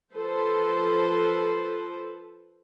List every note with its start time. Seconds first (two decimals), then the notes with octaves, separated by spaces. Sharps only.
0.15 F3 A4 B4 C5